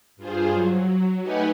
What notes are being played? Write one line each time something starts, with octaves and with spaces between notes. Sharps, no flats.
G2 F4 G#4 C5
F#3
A3 D#4 G4 B4 F#5 G#5